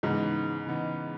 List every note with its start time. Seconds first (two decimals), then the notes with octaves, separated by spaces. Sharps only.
0.03 G#2 C#3 E3 G#3 B3 D#4
0.66 C#3 E3 B3 D#4